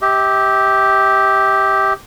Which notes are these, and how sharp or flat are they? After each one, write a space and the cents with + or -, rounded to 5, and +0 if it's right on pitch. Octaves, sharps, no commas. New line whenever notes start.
G4 +0 E5 -45